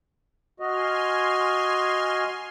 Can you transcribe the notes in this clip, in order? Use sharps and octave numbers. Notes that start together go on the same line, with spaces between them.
F#4 D#5 G#5 C6 F6